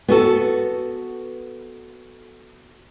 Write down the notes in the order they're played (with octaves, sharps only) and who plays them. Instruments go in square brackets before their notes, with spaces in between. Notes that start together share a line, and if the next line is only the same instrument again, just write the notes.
[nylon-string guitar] B3 F#4 A4